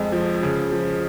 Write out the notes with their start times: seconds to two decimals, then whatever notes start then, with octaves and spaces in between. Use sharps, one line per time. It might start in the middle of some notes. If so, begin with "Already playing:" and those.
Already playing: F2 G#3
0.12 F3
0.43 C#3
0.72 F3